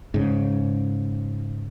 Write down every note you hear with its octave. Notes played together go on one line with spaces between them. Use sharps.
G#2 C#3